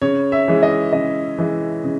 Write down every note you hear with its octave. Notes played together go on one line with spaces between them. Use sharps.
C#3 C#5
E5
E3 G#3
D#5
C#3 D#5
E3 G#3
C#3